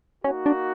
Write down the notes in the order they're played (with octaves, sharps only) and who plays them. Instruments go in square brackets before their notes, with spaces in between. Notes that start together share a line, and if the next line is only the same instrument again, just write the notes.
[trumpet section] A#3 D#4 F#4 [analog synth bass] C#4
[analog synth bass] D4